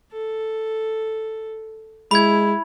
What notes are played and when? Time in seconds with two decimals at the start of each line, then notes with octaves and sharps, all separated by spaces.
0.12 A4
2.11 G#3 E4 B5 G#6